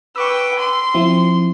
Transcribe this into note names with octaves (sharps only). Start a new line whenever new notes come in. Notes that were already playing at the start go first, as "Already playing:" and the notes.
B4 G5 C#6 D6 E6
C6
F3 C4 E4